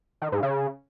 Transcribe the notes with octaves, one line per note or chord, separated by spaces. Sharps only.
D#3
G#2
C#3